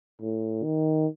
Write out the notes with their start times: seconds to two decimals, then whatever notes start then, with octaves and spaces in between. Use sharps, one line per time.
0.21 A2
0.63 D#3